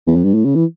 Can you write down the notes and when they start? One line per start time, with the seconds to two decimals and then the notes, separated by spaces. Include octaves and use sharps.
0.07 E2
0.16 F2
0.24 G2
0.34 A2
0.45 C#3
0.55 E3